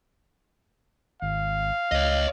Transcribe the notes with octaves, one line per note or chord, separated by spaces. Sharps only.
G#1 F5
C#2 C#5 D#5